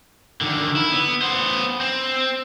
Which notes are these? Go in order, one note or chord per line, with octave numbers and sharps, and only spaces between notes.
D3 D#3
E4
B3
B3 C5
C4